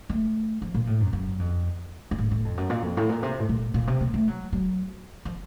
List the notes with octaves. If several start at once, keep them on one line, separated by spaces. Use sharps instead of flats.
A3
F3
A#2
A2
F#2
F#2
F2
F#2
A2
A2
F2
F#2
A#2
F2
A2
A#2
C3
A2
A#2
A#2
C3
A#3
A3
F#3
F#3
F3